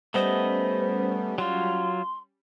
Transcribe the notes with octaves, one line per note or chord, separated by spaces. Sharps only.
G3 A3 B3 C#4 C5 D#5
F#3 F4 C6